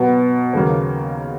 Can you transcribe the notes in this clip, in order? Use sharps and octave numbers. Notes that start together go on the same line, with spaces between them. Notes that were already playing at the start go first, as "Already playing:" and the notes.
Already playing: B2 F#3 B3
D#2 C#3 F#3 A#3